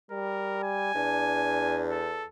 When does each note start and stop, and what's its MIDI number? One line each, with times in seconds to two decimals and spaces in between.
0.11 0.93 55
0.11 0.62 70
0.63 1.85 80
0.95 2.27 40
0.95 2.04 62
1.91 2.27 69